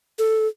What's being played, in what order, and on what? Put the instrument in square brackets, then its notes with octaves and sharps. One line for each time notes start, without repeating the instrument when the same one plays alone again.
[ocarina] A4